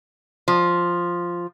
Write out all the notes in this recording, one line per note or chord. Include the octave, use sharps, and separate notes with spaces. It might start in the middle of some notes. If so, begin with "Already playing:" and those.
F3